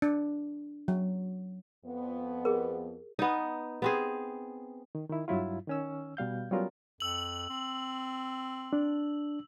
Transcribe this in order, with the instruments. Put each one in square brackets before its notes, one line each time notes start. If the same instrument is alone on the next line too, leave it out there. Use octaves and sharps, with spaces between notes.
[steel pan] D4
F#3
[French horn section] F2 B3
[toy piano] G4 G#4 A#4
[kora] B3 D#4
B3 C4 G#4
[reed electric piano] D#3
D#3 E4
G2 F#3 E4 F4
D#3 C#4 E6
B2 G3 F5 G6
F#3 G3 B3 C#4 F4 A#4
[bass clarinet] F2 [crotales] E6 F#7
[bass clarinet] C4
[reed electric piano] D4